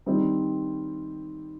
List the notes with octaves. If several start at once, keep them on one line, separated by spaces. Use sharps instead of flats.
D#3 G3 C4 D#4